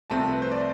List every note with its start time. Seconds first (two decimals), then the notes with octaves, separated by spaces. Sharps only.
0.10 C2 C3 F3 A3 C4 A5
0.33 B4
0.42 C5
0.52 D5